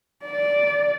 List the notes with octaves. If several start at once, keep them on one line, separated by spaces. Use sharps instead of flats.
D5